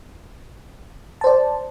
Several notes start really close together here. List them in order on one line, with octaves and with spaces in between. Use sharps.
A5 C5 D5